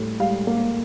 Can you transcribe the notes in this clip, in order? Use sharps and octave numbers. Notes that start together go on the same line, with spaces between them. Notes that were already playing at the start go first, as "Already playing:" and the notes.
Already playing: A2 G3
G3 F5
A#3